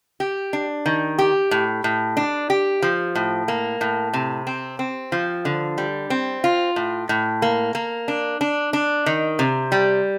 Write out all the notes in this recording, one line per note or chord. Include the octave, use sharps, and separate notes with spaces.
G4
D4
D#3
G4
A2
A2
D4
G4
F3
A2
A#3
A2
C3
C4
C4
F3
D3
G3
C4
F4
A2
A2
A#3
A#3
D4
D4
D4
D#3
C3
G3